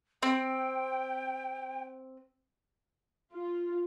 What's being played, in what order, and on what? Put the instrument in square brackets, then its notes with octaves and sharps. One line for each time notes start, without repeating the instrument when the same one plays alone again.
[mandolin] C4 [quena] G5
[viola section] F4